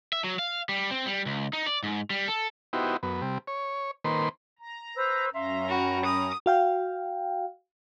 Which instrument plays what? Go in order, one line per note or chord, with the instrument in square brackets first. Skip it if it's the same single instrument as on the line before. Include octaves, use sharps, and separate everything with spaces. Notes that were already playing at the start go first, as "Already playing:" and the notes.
[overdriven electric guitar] E5
F#3
F5
G3
C4
G3
C#2
D#4
D5
G#2
G3
A4
[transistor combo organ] B3 D#4 E4 F#4 G4 C5
F#2 B3
C3 G3
C#5
D#3 A#3 B4 C5 C6
[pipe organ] A#5
[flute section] B4 C5 E6
[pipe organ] F#2 C#4 A#5 [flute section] E5 F5 C6
[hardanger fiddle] F#4 [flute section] G5 B5
[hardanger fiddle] D#6
[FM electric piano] F#4 F5 G5